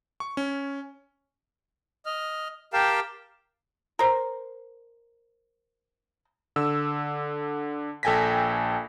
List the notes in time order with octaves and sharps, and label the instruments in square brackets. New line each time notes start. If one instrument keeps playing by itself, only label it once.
[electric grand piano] C#6
C#4
[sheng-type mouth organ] D#5 F6
G4 A#4 F5 G5 A5
[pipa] A#4 C5
[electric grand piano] D3 E6
A#1 A4 G5 G#5 A#6 B6